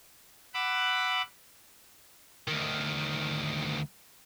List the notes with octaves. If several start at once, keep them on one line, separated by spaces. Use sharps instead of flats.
F#5 B5 D6 E6 F#6
D2 D#3